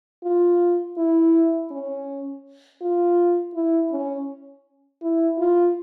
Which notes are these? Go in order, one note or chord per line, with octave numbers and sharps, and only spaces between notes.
F4
E4
C#4
F4
E4
C#4
E4
F4